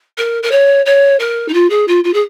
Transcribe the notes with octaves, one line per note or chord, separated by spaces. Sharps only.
A#4
A#4
C#5
C#5
A#4
D#4
F4
G#4
F4
F4
G#4